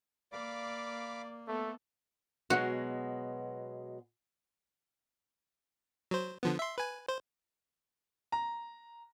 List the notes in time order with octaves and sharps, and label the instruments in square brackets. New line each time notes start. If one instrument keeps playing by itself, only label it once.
[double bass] A#3 [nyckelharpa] D5 [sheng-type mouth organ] F5 B5 D6
[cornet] A3 [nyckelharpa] B3 A4
[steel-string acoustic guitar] B2 F#3 G#3 [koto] F#4
[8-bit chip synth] F#3 C5
D3 F3 B3
E5 C6
B4 G#5
C5
[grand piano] A#5